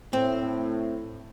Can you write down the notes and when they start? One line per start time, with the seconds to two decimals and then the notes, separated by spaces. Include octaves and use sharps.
0.13 A2 C4